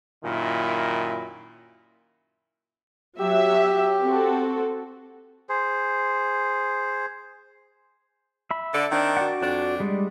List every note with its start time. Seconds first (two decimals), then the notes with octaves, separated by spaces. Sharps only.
0.23 F#2 A#2 D#3 E4
3.20 F#3 G4 E5
4.03 C4 F#4 A4
5.49 G#4 C5
8.51 E5 B5
8.74 D3 A4 D5
8.92 D#3 C4 D4
9.17 F#4 D5 F#5
9.42 F2 D4
9.80 G3 G#3